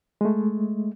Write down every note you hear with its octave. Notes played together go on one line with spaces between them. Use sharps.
G#3 A3